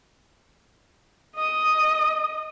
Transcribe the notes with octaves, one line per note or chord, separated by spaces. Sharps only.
D#5 D#6